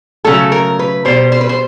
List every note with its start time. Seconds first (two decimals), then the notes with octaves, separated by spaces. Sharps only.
0.25 C#3 F#3 A3 A4
0.52 A#4
0.79 B4
1.05 B2 G3 C5
1.32 C5
1.41 B4
1.49 C5